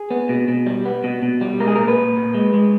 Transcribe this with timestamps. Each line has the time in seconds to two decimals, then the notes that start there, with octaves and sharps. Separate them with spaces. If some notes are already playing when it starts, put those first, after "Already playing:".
Already playing: G#4
0.10 B3
0.29 B2
0.48 B2
0.66 G3
0.85 B3
1.04 B2
1.22 B2
1.41 G3
1.60 G#3 A#4
1.68 G#4
1.76 A#2 A#4
1.88 B4
1.97 A#2
2.16 A#2
2.34 G#3
2.54 G#3